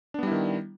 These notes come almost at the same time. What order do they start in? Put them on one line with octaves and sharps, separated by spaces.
D4 B3 G3 E4 D#3